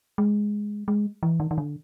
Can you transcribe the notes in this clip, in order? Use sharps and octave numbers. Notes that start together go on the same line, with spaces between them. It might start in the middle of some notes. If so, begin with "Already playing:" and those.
G#3
G#3
E3
D#3
D#3
D3